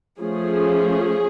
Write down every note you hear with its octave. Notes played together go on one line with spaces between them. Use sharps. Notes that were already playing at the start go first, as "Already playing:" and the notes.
F3 A3 C#4 G#4